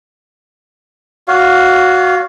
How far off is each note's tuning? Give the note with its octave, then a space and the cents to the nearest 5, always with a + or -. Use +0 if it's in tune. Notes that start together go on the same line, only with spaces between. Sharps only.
F#4 -5 C#5 +45 F5 +0